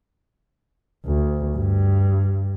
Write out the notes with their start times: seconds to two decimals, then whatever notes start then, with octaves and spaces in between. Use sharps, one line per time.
1.06 D2
1.57 G2